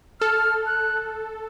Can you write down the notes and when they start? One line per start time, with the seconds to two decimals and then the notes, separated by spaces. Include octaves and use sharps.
0.20 A4 F6
0.66 F#6